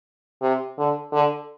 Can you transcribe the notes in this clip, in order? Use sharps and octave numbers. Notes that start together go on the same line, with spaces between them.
C3
D3
D3